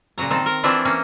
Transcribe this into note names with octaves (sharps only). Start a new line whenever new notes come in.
A#2 C#3 F#3 A#5
D#3 C4 D#4 A5
A#4
E3 F3 C4 D4 E4 F4
E3 A#3 C#4